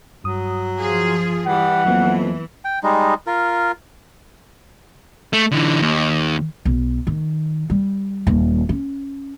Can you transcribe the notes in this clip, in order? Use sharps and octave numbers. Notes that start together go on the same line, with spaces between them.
G2 F#3 D#6
F3 F4 G#4
E3 G3 F#5
F2 F#3 A#3 B3
G5
G3 G#3 D#4
F4 A#4
A3
D3 E3
D#2
B1
D#3
G3
D#1
C#4